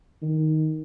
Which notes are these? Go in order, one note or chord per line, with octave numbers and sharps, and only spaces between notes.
D#3